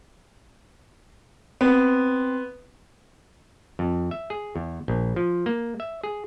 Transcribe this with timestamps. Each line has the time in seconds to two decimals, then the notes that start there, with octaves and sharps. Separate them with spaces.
1.61 B3 C4
3.79 F2
4.11 E5
4.30 G#4
4.56 E2
4.88 A#1
5.16 F3
5.46 A#3
5.80 E5
6.04 G#4